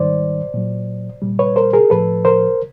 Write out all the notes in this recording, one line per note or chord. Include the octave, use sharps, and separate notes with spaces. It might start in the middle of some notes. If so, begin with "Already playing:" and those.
Already playing: G#2 D#3 G3 C5 D5
A#2 F#3
A#2 G3
B4 C#5
A#4 C5
G#4 A#4
A2 F3 A4 B4
A#4 C5